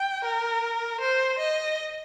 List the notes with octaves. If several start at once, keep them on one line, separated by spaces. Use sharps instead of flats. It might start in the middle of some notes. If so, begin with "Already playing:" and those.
Already playing: G5
A#4
C5
D#5